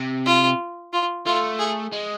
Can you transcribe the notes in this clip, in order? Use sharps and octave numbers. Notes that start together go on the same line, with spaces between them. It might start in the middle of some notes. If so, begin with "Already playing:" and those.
Already playing: C3
F4
F4
A3 F4
G#4
G#3